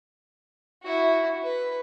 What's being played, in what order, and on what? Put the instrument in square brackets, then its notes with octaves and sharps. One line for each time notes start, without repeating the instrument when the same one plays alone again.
[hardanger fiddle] E4 F#4
B4